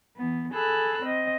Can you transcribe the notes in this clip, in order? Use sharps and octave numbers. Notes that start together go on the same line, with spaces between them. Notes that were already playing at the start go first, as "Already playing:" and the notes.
E3 B3
G#4 A4 B5 E6 F#6
C4 D#5